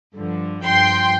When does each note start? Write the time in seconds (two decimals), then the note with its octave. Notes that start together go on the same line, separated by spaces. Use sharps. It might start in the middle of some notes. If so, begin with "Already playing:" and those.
0.16 G2 D3 F3
0.64 G2 F3 G5 C6